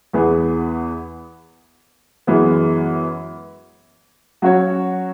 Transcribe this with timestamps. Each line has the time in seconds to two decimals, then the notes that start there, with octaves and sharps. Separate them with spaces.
0.13 E2 E3 B3 G#4
2.27 F#2 E3 G#3 B3
4.42 F#3 C#4 F#4 C#5